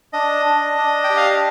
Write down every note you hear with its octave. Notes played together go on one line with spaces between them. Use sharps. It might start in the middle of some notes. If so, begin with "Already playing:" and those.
D4 D#5
D4
D4
G5
G4
F5
D#5